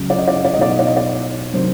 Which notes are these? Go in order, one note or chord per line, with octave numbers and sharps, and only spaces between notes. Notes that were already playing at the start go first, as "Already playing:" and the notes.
Already playing: C#2 C#3 F#3
D5
D#5
D5
D#5
D5
D#5
B1 B2 F#3 D5
D#5
D5
D#5
D5
C3 D#3 F#3 C5